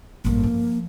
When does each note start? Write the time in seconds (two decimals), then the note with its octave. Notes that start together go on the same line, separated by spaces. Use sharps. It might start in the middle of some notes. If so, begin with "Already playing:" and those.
0.25 A1 G2 A#3
0.44 F3